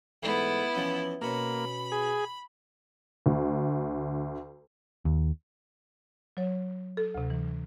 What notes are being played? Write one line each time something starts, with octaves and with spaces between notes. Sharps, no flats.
G#2 E3 A3 B3 E4
E3 F3 C#4
B2 A#3 C#4 B5
G#4
D2
D#2
F#3 C#5
A4
D2 C3
E3